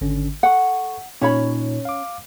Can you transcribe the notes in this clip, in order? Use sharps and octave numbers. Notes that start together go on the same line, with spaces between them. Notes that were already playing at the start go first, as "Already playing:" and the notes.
G#1 D3 C#4
A4 F#5 C#6
A#2 C#4 D#4 C#5 B5
F5 D6